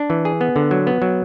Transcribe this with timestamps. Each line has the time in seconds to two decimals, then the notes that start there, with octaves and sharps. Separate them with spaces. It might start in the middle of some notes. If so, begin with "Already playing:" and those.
Already playing: D4
0.10 E3
0.25 G#4
0.41 B3
0.56 D3
0.71 F#3
0.87 B3
1.02 F#3